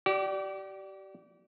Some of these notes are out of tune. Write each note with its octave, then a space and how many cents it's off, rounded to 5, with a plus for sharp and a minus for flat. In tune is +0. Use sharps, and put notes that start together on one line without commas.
G4 -40 D5 +0